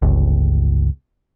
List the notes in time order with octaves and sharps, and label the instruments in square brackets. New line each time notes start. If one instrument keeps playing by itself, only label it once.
[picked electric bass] G1 C#2